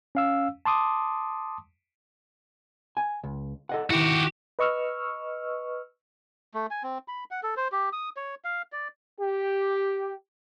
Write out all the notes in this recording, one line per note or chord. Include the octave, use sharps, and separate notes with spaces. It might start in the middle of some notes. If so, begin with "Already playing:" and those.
C#4 F5 E6
A5 C6 D6 D#6
G#5
C#2
A4 D#5 F#5
D#3 E4 F#4 G4
B4 D#5 C#6 E6 F6
A3
G#5
C4
B5
F#5
A4
C5
G4
D#6
C#5
F5
D5
G4